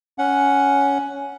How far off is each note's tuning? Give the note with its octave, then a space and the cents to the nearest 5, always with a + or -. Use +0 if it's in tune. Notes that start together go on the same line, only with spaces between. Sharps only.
C#4 +10 F#5 +0